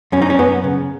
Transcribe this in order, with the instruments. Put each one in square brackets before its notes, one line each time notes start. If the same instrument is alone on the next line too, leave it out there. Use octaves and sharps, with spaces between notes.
[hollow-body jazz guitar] F#2 C#4
D#4
C#4
F#2 B3
C#3